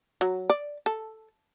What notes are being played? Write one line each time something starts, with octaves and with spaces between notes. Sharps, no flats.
F#3
D5
A4